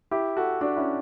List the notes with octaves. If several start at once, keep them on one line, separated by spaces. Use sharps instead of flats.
E4 G4
F#4 A4
D4 F#4
C#4 E4